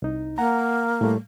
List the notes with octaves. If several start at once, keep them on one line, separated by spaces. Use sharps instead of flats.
C2 D#4
A#3 F#5 A#5
A2 G3 A3